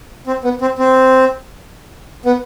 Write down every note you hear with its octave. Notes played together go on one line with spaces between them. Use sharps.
C4
B3
C4
C4
B3